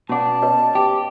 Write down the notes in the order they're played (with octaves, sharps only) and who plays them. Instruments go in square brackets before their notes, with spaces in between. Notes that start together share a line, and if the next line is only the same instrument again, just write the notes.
[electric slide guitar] B2 D5 [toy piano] C#4 F#5 [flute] A5
[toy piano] B4 C#5 D#5
[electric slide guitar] G4 [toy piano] G5